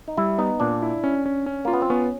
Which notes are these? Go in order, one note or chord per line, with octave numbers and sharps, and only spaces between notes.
D#4
G3 E4
B3 D#4
A#2 D4
E4
C#4
C#4
C#4
A#3 F4
B3
C4
B3 C#4